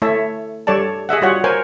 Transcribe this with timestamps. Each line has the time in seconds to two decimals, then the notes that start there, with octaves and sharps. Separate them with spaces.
0.02 A3 E4 C#5 E5 A5
0.67 G3 A4 C#5 D5 A5
1.09 G#4 D#5 E5 F#5
1.22 G3 F4 F#4 C#5 F#5
1.44 A#4 C5 C#5 G#5